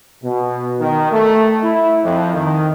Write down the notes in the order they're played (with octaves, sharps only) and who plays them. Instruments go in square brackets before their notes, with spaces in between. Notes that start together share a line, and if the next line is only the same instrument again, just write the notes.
[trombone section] B2
D#3
A3
E4
F2
D#3